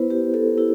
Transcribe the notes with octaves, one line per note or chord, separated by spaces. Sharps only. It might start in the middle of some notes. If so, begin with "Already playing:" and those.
Already playing: B3 E4 B4 C5
G4
A4
E4 G4